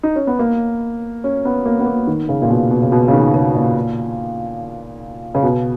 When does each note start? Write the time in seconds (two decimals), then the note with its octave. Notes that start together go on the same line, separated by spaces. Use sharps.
0.03 D#4
0.16 C#4
0.27 B3
0.39 A#3
1.24 C#4
1.45 B3
1.66 A#3
1.80 B3
1.87 A#3
2.07 D#3
2.29 C#3
2.42 A#2
2.50 B2
2.71 B2
2.82 C#3
2.92 B2
3.08 C#3
3.13 D#3
3.34 C#3
3.55 A#2
5.35 C#3
5.43 B2